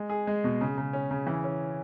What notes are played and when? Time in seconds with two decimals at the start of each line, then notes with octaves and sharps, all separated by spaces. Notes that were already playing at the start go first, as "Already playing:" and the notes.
Already playing: G#3
0.10 G#4
0.27 G#3
0.44 B2
0.61 C#3
0.78 C#3
0.93 C#4
1.11 C#3
1.27 E3
1.44 C#4